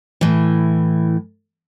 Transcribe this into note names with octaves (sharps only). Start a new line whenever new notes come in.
A2 E3